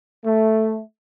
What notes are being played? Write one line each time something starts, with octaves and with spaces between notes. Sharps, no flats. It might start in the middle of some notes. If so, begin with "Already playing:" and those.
A3